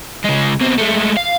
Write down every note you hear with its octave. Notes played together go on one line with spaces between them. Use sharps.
C#3 G#3
B2 C4
G#3 A3
F5